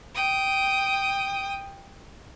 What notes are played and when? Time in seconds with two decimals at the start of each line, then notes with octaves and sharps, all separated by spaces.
0.15 G5 D#6